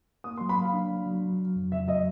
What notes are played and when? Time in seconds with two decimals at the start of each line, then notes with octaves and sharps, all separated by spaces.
0.24 A#3 D#6
0.37 F#3 C6
0.49 B5
0.58 F#3 F5
0.73 D4
0.90 F#3
1.06 F#3
1.22 F#3
1.39 F#3
1.56 F2
1.72 C#3 E5
1.88 F#3 D#5